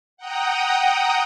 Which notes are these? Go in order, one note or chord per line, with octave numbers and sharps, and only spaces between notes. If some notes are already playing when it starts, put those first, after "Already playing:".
F#5 G5 A#5 D#6